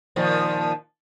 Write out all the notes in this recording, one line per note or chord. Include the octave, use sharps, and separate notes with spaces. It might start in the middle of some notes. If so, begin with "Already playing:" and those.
A#2 D#3 F3